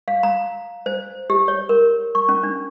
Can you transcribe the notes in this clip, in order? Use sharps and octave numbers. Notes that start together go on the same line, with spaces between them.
F5
A#5
C5
G4
C#5
A#4
C#6
C#4
D4